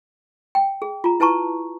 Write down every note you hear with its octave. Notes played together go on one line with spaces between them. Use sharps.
G5
G#4
F4 A#5
E4 B4 A5 A#5 C#6